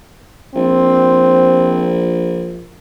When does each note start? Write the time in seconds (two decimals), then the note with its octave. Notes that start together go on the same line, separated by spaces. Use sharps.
0.55 A#1 C4